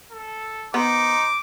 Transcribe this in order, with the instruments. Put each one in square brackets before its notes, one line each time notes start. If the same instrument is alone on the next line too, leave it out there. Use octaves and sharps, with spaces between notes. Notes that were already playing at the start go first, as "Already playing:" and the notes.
[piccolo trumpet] A4
[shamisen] B3 [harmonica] D#4 C5 [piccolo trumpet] D6